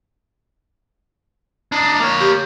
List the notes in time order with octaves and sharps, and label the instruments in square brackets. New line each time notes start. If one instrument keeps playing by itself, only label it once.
[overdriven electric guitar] D4 D#4
A#3 C#5
[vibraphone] G4